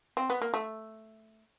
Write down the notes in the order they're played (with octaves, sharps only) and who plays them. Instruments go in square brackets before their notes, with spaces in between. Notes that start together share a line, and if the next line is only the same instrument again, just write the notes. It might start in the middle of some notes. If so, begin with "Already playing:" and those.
[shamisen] C4
B3
A#3
A3